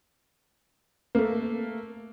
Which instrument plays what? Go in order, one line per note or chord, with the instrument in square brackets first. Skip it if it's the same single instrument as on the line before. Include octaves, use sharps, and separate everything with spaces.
[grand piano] A3 A#3